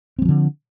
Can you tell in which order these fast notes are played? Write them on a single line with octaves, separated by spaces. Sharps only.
C4 G3 F3 D3